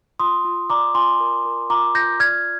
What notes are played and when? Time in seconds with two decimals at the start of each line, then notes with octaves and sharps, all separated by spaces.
0.19 F4 C6 D#6
0.45 F4
0.70 D5 A#5 D6
0.95 F4 G#5 C6
1.20 A#4
1.45 A#4
1.70 F4 A#5 D6
1.95 F4 G6 A#6
2.20 D5 F6 G#6